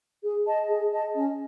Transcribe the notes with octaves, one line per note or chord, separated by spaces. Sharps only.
G#4
D#5 A5
G#4
D#5 A5
C#4